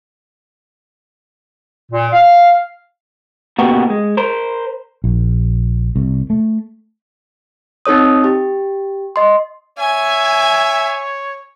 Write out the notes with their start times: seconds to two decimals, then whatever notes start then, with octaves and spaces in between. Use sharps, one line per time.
1.92 A#2
2.13 F5
3.59 A#2 C#3 B3 F#4 G4 A#4
3.90 G#3
4.17 A#4 C5
5.04 A#1
5.96 C2
6.30 A3
7.86 C4 D#4 A4 C#5 D#6
8.24 G4
9.16 D#5 C6
9.79 C#5 E5 G#5 G#6